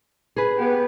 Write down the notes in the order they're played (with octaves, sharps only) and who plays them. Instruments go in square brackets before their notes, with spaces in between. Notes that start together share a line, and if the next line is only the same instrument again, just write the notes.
[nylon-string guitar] G#4 B4
[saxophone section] B3 G4